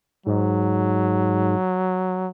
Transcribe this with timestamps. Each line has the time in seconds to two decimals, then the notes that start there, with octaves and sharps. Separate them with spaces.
0.26 G#2 F#3